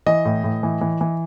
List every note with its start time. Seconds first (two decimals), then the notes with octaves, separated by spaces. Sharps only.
0.06 E3 D#5
0.25 A2
0.44 A2
0.63 E3
0.81 E3
1.01 E3